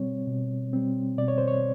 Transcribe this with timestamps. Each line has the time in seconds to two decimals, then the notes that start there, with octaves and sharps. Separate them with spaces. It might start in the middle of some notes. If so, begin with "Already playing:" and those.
Already playing: B2 G3 C4 C#5
0.27 B2
0.73 G3 C4
1.18 B2 D5
1.28 C#5
1.38 C5
1.48 C#5